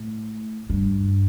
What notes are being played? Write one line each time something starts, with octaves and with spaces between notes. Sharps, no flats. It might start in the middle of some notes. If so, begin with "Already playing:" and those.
Already playing: A2
G2